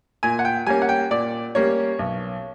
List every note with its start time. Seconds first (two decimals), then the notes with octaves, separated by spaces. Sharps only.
0.23 A#2 G#5
0.39 F#5
0.45 G5
0.67 G3 A#3 C#4 G#5
0.82 F#5
0.89 G5
1.11 A#2 D5
1.55 G3 A#3 C#4 C#5
1.99 B1